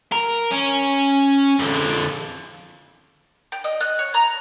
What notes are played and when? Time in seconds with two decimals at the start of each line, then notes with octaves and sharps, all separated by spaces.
0.12 A#4
0.51 C#4
1.59 F2 D3
3.52 G5
3.64 D#5
3.80 F#6
3.99 C#5
4.14 A#5